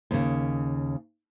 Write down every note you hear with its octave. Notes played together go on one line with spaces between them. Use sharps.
D#2 C#3